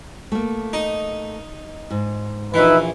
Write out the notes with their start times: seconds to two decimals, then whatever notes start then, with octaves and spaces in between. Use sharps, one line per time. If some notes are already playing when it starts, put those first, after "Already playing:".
0.32 A3 A#3
0.73 D#4
1.91 G#2
2.54 A#1 E3 D#4 B4 E5